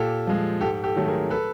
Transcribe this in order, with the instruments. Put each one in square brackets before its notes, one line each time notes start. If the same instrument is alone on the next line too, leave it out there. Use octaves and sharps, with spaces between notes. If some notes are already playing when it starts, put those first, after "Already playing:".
Already playing: [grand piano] A#2 G4 A4
F3 G#3
G#2 G4 A4
G4 A4
D#3 F#3 A3
G#4 A#4
A4 B4